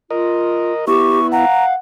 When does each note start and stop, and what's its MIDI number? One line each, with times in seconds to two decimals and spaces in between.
0.11 0.73 65
0.11 0.85 70
0.11 0.85 75
0.87 1.45 59
0.87 1.45 64
0.87 1.19 67
0.87 1.27 85
1.32 1.75 77
1.32 1.78 78
1.32 1.65 82